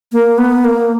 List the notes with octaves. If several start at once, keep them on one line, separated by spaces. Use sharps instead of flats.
A#3
B3
A#3